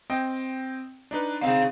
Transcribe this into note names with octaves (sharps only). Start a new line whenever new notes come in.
C4 D#5 G5
D4 D#4 B4
C4 D#4 G#4 F5